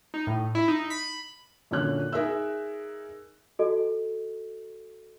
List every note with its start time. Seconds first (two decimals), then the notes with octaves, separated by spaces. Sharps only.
0.14 D#4
0.27 A2
0.55 E4
0.68 D#4
0.90 B5
1.71 F#2 A#2 D3 C#5 F#6
2.13 D#4 G#4 A#4 E5 E6
3.59 F#4 A4 D#5